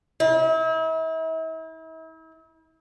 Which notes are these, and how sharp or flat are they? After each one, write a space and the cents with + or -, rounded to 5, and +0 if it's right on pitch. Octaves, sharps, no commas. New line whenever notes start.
E4 -40